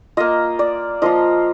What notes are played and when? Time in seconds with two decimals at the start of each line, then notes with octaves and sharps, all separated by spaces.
0.17 A#3 F4 D#5
0.59 D5
1.02 F3 A#3 F4 D#5